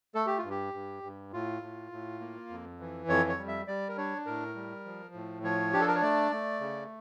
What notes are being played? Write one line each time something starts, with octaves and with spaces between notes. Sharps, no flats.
A3 A4
G4
F4
G2
G4
G2
G2
A2 F4
A2
A2
A#3
F2
E3
F2 C#5
C#5
G3
E5
G3 D5
A#4
D4 C#5
A2 A#4
G3
F3
A2
F3 C#5
D4 G4
A4
A#4
C#5
A3 D5
A3
C#3